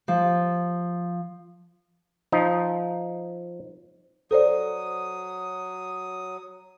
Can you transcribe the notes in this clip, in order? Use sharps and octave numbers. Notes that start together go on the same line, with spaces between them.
F3
F3 D#4
F#3 A4 C5 D5 D#6